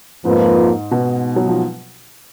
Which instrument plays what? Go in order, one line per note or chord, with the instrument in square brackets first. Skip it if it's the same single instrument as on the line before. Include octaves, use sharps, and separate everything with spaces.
[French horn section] F2 F3 A#3 F4 B4 [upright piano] G#2
[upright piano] B2
F#3
F3